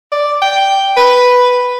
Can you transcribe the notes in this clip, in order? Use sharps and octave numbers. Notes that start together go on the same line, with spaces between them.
D5
G5
B4